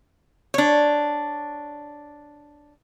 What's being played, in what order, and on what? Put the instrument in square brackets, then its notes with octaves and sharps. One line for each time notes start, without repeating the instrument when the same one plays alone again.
[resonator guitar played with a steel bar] D4 C#5